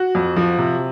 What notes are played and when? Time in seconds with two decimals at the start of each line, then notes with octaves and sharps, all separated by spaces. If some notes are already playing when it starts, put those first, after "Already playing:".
Already playing: F#4
0.15 F2
0.36 F3
0.58 C3